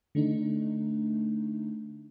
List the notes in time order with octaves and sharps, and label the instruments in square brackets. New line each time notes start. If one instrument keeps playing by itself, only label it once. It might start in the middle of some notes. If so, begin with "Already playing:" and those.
[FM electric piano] D3 A3 D4 D#4